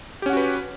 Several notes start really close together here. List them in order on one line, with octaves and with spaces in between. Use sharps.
G4 C#4 F#5 F#4 B4